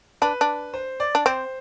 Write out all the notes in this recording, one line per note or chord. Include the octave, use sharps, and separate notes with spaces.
D4 B4
D4
C5
D5
D4
C4 C5